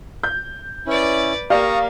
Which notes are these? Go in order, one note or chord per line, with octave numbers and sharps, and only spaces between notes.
G6
C#4 E4 B4 D5
A#3 G4 D5 F5 A#5 C#6 D#6